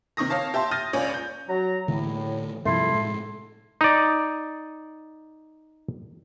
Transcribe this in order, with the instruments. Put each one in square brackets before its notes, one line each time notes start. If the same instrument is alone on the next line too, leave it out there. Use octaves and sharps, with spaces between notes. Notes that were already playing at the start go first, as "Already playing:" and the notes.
[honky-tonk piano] C3 D#3 C#6 D#6 A#6
C#5 F5 A5
G4 E5 A5 C6
D#6 F6 G6 A6 A#6 D#7
C#2 C#3 C#5 D5 G#5
G6
[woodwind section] F#3 A#5
[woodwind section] A2 [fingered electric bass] D3 E3 A3
[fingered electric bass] G2 C3 F3 [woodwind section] A3 E4 C6
[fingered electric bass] A2 G#3
[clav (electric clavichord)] D#4 D5